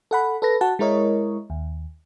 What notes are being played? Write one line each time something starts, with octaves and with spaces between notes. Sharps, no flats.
A4 F#5 B5
A4 B4 A#6
F#4 F#5 A5
G#3 E4 A#4 C#5 D#5
D#2